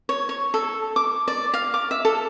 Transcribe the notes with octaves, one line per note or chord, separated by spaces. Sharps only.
C#5
C#5
A4
D6
D5
F5
D6
E5
A4